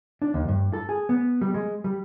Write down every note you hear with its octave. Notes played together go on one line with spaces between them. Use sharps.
D4
D#2
G2
A4
G#4
B3
G3
G#3
G3